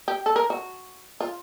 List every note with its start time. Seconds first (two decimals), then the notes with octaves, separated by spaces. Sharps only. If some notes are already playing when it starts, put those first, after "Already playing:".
0.08 G4
0.26 A4
0.36 A#4
0.50 F#4
1.21 F4